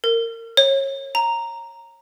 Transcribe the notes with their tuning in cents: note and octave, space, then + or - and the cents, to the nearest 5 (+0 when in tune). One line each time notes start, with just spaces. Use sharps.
A#4 -25
C#5 -25
A#5 -5